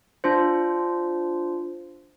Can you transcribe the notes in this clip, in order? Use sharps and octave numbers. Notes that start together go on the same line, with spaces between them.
D4 F4 C5